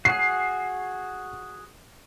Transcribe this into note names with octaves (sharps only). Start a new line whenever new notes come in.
F#4 G#4 C7